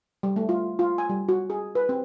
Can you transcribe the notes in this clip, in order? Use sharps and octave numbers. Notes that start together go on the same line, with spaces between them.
G3
A3
F4
F4
G#5
G3
F#4
G#4
B4
C4